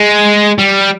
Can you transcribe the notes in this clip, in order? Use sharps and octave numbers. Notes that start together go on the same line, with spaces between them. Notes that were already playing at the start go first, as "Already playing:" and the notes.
Already playing: G#3
G3